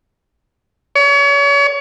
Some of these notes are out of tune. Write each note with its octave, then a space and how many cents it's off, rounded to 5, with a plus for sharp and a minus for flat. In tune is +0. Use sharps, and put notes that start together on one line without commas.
C#5 +35